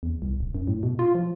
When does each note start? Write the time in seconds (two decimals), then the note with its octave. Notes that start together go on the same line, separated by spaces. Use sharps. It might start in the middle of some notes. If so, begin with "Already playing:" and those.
0.03 E2
0.22 C2
0.40 D1
0.55 F#2
0.68 A2
0.83 B2
0.99 F4
1.15 F3